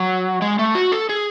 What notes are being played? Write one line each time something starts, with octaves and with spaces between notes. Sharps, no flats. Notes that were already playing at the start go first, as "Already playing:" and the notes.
Already playing: F#3
G#3
A3
F#4
A4
G#4